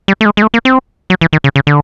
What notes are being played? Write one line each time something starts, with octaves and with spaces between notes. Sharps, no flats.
G3
A3
G#3
G#3
A3
A#3
C4
F#3
E3
D#3
C#3
C#3
D3